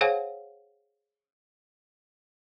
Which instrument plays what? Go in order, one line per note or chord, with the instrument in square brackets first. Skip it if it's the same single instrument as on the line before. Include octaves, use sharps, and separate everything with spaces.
[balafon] G#4 C5 C#5 F5 F#5 G#5